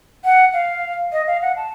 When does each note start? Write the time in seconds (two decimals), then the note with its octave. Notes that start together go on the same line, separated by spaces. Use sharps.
0.24 F#5
0.53 F5
1.12 D#5
1.27 F5
1.42 F#5
1.57 A5